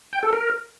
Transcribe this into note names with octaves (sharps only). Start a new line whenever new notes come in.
G5
A4
A#4